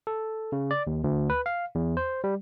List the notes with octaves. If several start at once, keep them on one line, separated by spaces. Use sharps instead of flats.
A4
C#3
D5
D#2
D2
B4
F5
E2
C5
G3